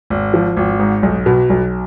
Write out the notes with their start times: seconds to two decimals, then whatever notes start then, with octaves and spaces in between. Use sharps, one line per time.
0.10 G#1
0.34 F3
0.57 G#1
0.79 G#2
1.03 B1
1.26 B2
1.50 B1